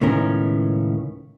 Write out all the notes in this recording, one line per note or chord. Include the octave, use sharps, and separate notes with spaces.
C#2 A2 D#3 B3 C#4 A#4